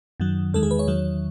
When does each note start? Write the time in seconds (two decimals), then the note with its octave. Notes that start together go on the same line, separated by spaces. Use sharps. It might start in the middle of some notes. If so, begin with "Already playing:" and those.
0.20 F#2 D#3 F#3
0.54 E2 D#3 G#3 A4
0.63 G#4
0.71 B4
0.79 C#5
0.88 E2 D#3 F#3